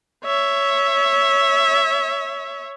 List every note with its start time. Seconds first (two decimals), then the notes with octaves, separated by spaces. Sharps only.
0.25 C#5 E5